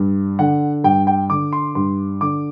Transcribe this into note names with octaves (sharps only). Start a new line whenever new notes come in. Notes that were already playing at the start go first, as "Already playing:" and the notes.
Already playing: G2
D3 F#5
G2 G5
G5
D3 D6
C6
G2 C6
D3 D6